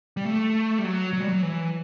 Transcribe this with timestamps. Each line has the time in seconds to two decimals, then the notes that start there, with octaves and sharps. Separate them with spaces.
0.17 G3
0.25 A3
0.79 G3
0.84 F#3
1.13 F#3
1.20 G3
1.28 F#3
1.43 E3